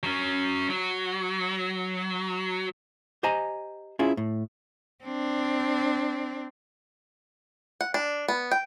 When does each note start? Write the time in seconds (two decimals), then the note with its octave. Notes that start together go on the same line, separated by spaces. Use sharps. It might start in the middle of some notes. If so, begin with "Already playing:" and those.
0.03 F#3 C#4
0.70 F#3
3.23 G4 C5 D#5 G#5 A#5
3.99 C#4 E4 F4 G#4
4.17 A2
5.04 C4 D4
7.81 F#5
7.94 D4
8.28 B3
8.51 G5